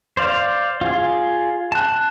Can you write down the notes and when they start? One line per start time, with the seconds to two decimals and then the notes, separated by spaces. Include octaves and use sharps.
0.17 C5 D5 F5
0.81 F4 G#4
1.72 A5 F#6